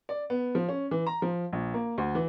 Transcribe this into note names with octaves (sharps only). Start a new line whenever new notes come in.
D5
B3
F3
C#4
E3
A#5
F3
A#1
A#3
D2
E3